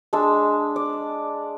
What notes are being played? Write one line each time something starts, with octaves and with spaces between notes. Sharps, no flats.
G#3 D4 A5 E6
D5